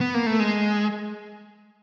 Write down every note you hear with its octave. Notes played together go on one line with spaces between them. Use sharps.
B3
A#3
A3
G#3